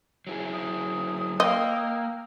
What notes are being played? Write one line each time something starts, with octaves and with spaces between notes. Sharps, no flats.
F#3 E4 G#4
D#6
A#3 D#5 F5 G5 E6